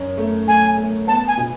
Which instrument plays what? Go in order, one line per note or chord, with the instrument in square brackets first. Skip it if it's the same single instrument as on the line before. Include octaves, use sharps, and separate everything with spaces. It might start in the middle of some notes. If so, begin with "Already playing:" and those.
Already playing: [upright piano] F#2 C#4
A3
[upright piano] A3 [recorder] G#5
[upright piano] A3
[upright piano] B3 [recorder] A5
[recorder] G#5
[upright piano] B2